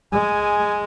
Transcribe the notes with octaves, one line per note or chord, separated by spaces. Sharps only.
G#3 G#5